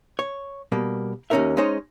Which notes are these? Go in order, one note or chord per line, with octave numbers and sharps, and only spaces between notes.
C#5
B2 G3 A#3
D#2 A#3 C#4 D#4 A#4 E5
G#3 C#4 D#4 C5 C#5